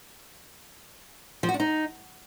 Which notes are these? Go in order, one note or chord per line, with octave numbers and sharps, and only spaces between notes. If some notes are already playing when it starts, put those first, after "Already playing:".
F3
F#4
D4
D#4